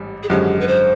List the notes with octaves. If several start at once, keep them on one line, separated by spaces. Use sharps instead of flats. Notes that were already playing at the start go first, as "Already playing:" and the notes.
Already playing: A1 G#2 G3
G#4
G#1 F#2 D3 F3 G#3 G4
B4
C5